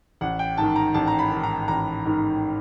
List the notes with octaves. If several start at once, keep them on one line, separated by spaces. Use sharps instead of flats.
A1 F#5
G5
G#2 D#3 A5
A#5
A1 A5
A#5
B5
G#2 D#3
A#5
A1 A#5
G#2 D#3